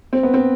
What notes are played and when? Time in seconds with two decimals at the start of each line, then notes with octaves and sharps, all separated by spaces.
0.13 C4
0.23 B3
0.34 C4